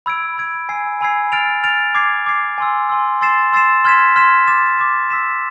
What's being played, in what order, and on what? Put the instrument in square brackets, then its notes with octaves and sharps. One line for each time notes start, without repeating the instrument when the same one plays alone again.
[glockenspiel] B5 E6 G#6 D7
B5 E6 G#6 D7
G#5 B5 E6 G#6 C7
G#5 B5 E6 G#6 C7
F6 A6 D7 F7
F6 A6 D7 F7
D6 G#6 C7
D6 G#6 C7
G#5 C6 E6
G#5 C6 E6
C6 E6 A6 C7 E7
C6 E6 A6 C7 E7
C6 F6 G#6 B6 E7
C6 F6 G#6 B6 E7
D6 A6 E7
D6 A6 E7
E6 B6 E7